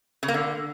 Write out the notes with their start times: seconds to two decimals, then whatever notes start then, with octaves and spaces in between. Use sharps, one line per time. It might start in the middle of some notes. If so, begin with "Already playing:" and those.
0.23 C#3
0.28 A#3
0.34 D3